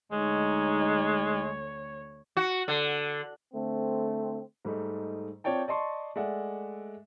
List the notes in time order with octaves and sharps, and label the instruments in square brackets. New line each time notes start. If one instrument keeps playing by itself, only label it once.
[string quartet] D2 C#5 [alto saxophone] G#3 [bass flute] D#4
[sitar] F#4
D3
[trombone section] D3 A3 C4
[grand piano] G#2 G3 A3 D#4
C4 F4 C#5 D5 G5 A5
D5 D#5 A5 C6 C#6
G#3 A3 D5 E5 F#5